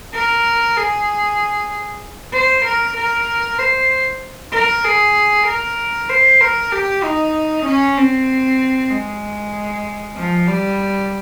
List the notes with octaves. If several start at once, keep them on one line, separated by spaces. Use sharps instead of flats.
A#4
G#4
C5
A#4
A#4
C5
A#4
G#4
A#4
C5
A#4
G4
D#4
C#4
C4
G#3
F3
G3